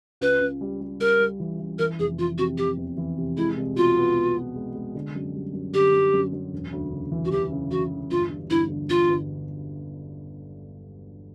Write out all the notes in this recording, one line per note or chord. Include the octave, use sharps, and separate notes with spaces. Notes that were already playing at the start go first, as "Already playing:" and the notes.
C#2 B4
C#2
G3
G3
G3 A#4
G3
E3
E3
E3 A#4
F1 G#4
E3 F4
C3 F#4
E3 G4
E2
E3
C3
G#3 E4
C2
B2 F4
B3
B3
B3
G#3
G#3
D3
F#2
G3
F#2
D3 G4
F#2
F#2
F#2
E1
D2
C#3
E3
F#4
E3 G4
C#3
E3 F#4
E1
G1 F4
G2
G1 E4
D3
G1 F4
G1